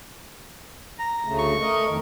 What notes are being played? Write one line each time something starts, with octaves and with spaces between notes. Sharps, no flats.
A#5
D2 C#3 A3
C#6
A3 A#4 D#5
F2 D#3